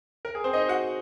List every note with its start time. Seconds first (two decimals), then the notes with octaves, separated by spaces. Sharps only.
0.25 A#4
0.35 G#4
0.44 C4 C5
0.53 D#4 D#5
0.68 F#4 F#5